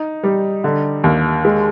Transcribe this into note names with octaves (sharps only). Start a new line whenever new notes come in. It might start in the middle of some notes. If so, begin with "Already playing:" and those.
Already playing: D#4
G3
D3
D#2
G#3